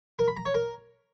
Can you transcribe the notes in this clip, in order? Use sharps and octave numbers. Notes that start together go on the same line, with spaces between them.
A#4
B5
A#5
C#5
A#4